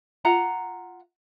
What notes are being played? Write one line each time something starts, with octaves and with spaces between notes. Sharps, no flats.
F4 F#5 A#5